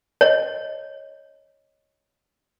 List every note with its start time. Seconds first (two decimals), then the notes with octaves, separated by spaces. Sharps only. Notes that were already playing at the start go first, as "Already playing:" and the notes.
0.21 C#5 D#5